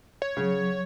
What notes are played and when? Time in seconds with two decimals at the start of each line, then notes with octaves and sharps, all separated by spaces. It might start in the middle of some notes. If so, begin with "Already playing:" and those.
0.22 C#5
0.37 C#3 F#3